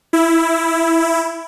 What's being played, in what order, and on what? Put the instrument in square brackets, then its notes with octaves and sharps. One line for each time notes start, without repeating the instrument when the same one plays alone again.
[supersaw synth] E4